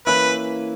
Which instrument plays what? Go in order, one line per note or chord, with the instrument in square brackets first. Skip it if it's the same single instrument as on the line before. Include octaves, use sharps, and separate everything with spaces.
[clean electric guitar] E3 A#3 C#4 E4 [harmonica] B4